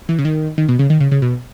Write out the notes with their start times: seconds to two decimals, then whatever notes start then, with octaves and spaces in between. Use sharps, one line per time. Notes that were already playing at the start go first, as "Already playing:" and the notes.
0.09 E3
0.19 C#3
0.25 D#3
0.58 D#3
0.68 B2
0.79 C#3
0.90 D#3
1.00 C#3
1.12 C#3
1.22 B2